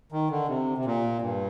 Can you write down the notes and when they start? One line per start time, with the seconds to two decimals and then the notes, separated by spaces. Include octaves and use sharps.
0.12 D#3
0.31 D3
0.48 C3
0.78 C3
0.85 A#2
1.22 G2